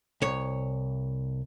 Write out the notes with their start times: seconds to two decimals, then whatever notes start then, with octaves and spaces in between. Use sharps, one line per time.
0.22 C2 C#5